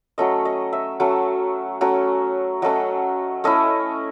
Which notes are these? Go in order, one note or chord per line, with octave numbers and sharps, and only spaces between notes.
F#3 A3 C#4 D#5
D#5
E5
F#3 A3 C#4
F#3 A3 C#4
F#3 A3 C#4 D#5
A3 C#4 E4 D#5